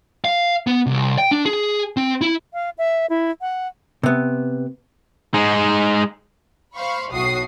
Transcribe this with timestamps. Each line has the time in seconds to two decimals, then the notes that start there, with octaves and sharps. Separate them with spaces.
0.25 F5
0.67 B3
0.86 C2
1.18 G5
1.31 D4
1.45 G#4
1.97 C4
2.21 E4
2.54 F5
2.78 E5
3.10 E4
3.41 F#5
4.03 C3 B3
5.34 G#3 D#4
6.75 C5 F5 B5 C#6
7.12 B1 A2 F#4 D#6 C7